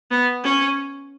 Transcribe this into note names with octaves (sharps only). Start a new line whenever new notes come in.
B3
C#4